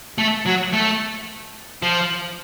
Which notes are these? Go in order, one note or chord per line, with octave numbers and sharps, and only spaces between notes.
A3
F#3
A3
F3